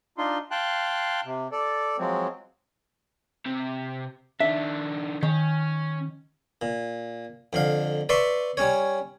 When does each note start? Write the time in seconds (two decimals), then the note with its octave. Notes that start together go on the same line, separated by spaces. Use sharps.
0.18 D4 D#4 F4 C6
0.51 F5 G5 A5 C6 F#6
1.25 C3
1.52 A4 D5
1.98 F3 F#3 G#3 C4
3.46 C3
4.40 D#3 D4 E5
5.23 D#3 C#4
6.62 A#2
7.53 F2 D3 F5
8.09 B4 D5 E5 C6 C#6
8.57 G3 C#4 C#5